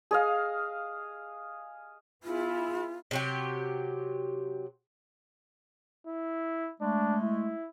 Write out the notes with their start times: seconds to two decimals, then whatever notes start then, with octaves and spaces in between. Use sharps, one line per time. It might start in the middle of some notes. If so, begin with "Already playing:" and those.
0.11 G#4 D#5 F5
2.23 B3 E4 F4 G#4
3.11 C3 F#3 G4
6.07 E4
6.81 G#3 A3 D4
7.23 E4